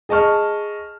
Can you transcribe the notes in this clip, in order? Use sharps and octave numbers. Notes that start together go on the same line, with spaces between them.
G#4 D#5 A5 C#6 F6